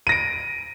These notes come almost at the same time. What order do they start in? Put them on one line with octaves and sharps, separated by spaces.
D#7 A#6 D7